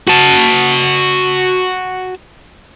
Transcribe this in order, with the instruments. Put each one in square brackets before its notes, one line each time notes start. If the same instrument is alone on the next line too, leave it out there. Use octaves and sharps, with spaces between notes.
[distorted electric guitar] F#4 A5